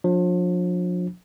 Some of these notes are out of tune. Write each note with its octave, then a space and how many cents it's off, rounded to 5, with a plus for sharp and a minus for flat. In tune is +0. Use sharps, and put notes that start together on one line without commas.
F3 +40 D4 +0